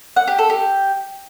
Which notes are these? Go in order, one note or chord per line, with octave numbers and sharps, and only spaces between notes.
F#5
G4
A4
G4